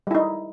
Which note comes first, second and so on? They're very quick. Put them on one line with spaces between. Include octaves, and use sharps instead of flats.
G3 E4 D#4